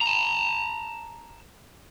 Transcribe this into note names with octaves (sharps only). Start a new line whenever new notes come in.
A5 A#5